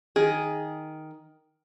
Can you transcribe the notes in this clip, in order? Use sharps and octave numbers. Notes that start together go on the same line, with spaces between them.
D#3 G#4